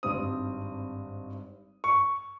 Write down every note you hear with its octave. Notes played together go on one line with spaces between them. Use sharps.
G#1 G2 G3 C4 D#6
C#6